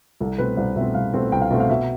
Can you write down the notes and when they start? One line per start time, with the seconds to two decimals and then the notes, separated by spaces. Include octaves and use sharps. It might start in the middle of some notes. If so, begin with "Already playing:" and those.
0.21 C2 A4
0.38 B2 A3 C4 B4
0.57 C2 C5
0.76 B2 A3 C4 E5
0.94 C2 F5
1.14 B2 A3 C4
1.32 C2 G5
1.41 F5
1.50 B2 A3 C4 E5
1.60 F5
1.70 B2 E5